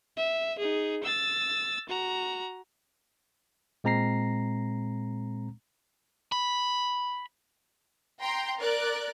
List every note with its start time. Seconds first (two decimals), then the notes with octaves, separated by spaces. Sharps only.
0.17 E5
0.59 D#4 G#4
1.03 E6 A6
1.88 F#4 A#5
3.84 A#2 G#3 C4 A#5 A#6 C7
6.32 B5
8.21 G5 A#5 C6
8.59 A#4 D5 F#6